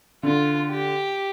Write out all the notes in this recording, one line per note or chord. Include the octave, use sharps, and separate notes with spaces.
D3 F4
G4